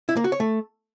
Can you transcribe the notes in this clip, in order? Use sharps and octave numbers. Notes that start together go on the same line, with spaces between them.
E4
A#3
F#4
C#5
A3